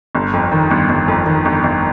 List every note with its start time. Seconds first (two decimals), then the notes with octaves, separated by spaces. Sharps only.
0.15 G1
0.33 F2
0.52 D#3
0.71 G1
0.89 G1
1.08 F2
1.26 D#3
1.45 G1
1.64 G1